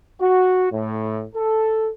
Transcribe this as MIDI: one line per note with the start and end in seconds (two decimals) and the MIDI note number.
0.21 0.67 66
0.71 1.24 45
1.35 1.89 69